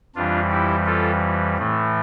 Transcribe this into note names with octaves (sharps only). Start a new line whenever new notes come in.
F2 E3 G3 D4 F4
E4 G4
F4 A4
A2 E3 A3